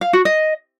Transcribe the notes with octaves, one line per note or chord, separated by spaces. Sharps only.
F5
F#4
D#5